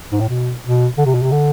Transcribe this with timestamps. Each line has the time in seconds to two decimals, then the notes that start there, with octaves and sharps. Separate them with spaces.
0.12 G#2
0.20 A2
0.29 B2
0.63 B2
0.97 D3
1.06 C3
1.14 B2
1.22 C3
1.31 D3